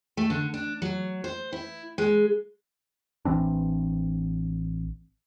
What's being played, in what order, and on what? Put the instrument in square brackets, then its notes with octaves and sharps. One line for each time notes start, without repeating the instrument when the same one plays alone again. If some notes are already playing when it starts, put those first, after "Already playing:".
[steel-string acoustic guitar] A3
D3
D4
F#3
C5
E4
G#3
[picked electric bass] A1 E3 C4 D4